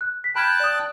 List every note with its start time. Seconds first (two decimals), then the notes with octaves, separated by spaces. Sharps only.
0.01 F#6
0.24 B6
0.36 G5 A5 B5 F6 F#6 G#6
0.60 D5 D#6